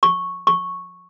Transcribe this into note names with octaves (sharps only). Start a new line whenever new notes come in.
C#6
C#6